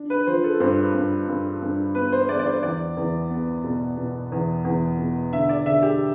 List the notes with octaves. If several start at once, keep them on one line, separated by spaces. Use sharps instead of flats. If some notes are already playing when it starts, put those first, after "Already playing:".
Already playing: D4
B4
F3 C5
A4
G2 C5
G2
G2
G2
B3 B4
C5
B3 D5
D5
C5
E2 D5
E2
B3
B2
B2
E2
E2
B2
D3 E5
D5
D3 E5
G4